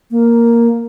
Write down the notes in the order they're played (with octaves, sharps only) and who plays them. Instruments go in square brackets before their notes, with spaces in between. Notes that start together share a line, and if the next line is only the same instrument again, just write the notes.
[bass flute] A#3